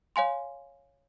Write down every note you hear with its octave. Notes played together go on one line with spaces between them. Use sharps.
C#5 F5 G#5 C6